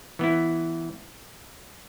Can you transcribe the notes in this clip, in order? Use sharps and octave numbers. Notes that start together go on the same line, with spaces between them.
E3 B3 E4